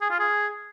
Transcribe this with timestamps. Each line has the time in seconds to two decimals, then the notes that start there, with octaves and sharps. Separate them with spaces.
0.01 G#4
0.10 F4
0.19 G#4